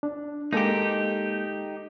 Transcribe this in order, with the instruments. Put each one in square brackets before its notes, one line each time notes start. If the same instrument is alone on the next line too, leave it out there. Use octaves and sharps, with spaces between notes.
[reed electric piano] D4
[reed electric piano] G#3 A#3 A4 [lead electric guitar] D#4 G4